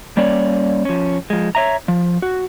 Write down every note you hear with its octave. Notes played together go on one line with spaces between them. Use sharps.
G3 A#3 C#4 C#5 D5
F3 C#4
F3 G#3
C#5 E5 A#5
F3
F#4